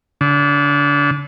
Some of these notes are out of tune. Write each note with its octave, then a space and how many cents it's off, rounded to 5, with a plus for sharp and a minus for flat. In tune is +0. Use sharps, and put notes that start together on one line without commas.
D3 -30